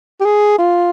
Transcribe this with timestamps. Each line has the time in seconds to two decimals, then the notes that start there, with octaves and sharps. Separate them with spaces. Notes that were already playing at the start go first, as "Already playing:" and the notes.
0.20 G4
0.25 G#4
0.58 F4